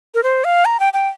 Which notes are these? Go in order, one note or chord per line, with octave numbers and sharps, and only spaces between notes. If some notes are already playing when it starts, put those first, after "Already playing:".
A#4
C5
F5
A#5
G5
G5